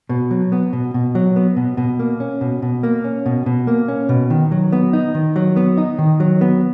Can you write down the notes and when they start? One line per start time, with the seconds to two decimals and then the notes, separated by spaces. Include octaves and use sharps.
0.09 B2
0.31 F#3
0.52 B3
0.73 B2
0.94 B2
1.15 F#3
1.36 B3
1.56 B2
1.77 B2
1.99 A#3
2.20 C#4
2.41 B2
2.62 B2
2.83 A#3
3.04 C#4
3.26 B2
3.46 B2
3.67 A#3
3.88 C#4
4.09 B2
4.30 D#3
4.51 F#3
4.72 B3
4.93 D#4
5.14 D#3
5.36 F#3
5.56 B3
5.77 D#4
5.98 D#3
6.20 F#3
6.41 B3